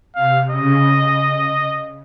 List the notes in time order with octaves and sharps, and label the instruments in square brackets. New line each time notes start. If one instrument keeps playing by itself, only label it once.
[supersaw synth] C3 [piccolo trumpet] F5
[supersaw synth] C#3 [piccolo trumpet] D#5